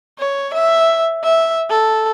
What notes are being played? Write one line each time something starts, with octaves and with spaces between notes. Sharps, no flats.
C#5
E5
E5
A4